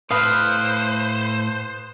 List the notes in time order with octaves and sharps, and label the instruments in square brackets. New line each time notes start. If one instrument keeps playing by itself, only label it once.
[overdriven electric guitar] A2 [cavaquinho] B4 F5 [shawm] C5 [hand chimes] D#6